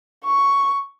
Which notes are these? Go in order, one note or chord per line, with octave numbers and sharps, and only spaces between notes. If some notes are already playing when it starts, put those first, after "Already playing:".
C#6